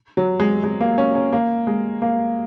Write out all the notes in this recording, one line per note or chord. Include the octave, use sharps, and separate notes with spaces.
F#3
G#3
G#3
A#3
C#4
C#4
A#3
G#3
A#3